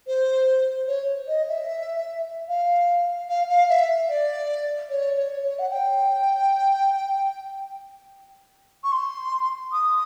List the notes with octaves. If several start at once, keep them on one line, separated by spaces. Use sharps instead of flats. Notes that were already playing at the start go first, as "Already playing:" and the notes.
C5
C#5
D#5
E5
F5
F5
F5
E5
D5
C#5
C#5
C#5
F#5
G5
C#6
C6
D#6